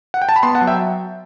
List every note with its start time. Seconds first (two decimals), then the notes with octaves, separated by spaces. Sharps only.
0.14 F#5
0.22 G5
0.29 A5
0.36 B5
0.43 B3 A5 C6
0.55 F#5 A5
0.61 F#3
0.67 E5 G5